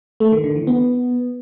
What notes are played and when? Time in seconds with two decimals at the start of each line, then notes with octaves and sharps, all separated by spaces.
0.20 A3
0.32 D#3
0.44 D3
0.56 E3
0.67 B3